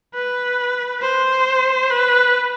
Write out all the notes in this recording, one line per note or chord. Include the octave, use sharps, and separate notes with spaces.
B4
C5
B4